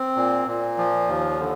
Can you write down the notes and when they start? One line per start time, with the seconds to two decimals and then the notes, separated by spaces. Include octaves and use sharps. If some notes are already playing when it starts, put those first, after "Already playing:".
Already playing: C4
0.16 A#2
0.47 A#2
0.78 F3
1.08 D#2
1.40 D3